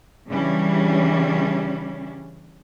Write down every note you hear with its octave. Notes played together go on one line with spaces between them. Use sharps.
C#3 E3 G3 C#4 D4